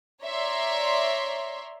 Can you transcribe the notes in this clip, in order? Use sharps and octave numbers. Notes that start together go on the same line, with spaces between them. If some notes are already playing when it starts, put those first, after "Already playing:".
C#5 D5 E5 A#5 C6